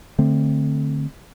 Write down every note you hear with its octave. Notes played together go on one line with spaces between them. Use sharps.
D3 A3 C4